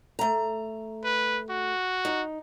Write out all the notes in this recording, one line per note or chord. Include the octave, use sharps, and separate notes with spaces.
A3 A#5
B4
F#4
D#4